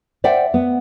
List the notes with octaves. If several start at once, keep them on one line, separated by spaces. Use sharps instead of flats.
C5 D5 E5 F#5 G5
B3